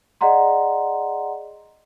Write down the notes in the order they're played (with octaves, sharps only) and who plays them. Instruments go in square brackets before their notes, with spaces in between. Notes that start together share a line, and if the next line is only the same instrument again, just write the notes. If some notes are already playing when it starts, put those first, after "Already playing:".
[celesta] G#4 D5 D#5 F#5 A#5 C6